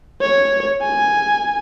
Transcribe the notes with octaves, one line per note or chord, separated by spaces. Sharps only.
C#5
G#5